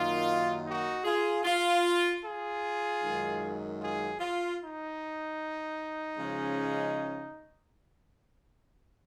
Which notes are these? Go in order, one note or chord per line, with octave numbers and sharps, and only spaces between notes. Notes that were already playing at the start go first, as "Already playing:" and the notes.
Already playing: F#2 D#3 A#3 D#4 F4
D#4 F#4
F4 G#4
F4
F4 G#4
F#2 D#3 G#3 D#4
F4 G#4
F4
D#4
C#3 F3 G#3 C#4